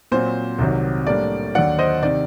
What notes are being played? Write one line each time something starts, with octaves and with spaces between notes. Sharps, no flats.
A#2 F#3 C4 C5
C2 C3 D#3 F#3
A2 G3 A#3 D4 D5
D#2 D3 F#3 D5 F#5
C5 D#5
C3 D#3 D5